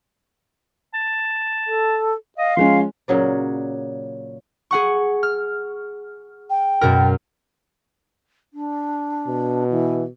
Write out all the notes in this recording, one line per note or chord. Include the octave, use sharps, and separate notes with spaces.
A5
A4
D#5 F5
F3 G#3 C#4 C6
A#2 C#3 F#3 D5
G#4 F#5 C#6
F6
G5
F#2 B2 A#4
D4
B2
E3